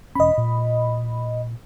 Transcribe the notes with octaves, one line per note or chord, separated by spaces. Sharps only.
E1 C#4 D#5 B5
A#2